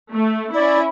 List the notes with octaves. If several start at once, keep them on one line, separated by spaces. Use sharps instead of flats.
A3
C#4 E4 D5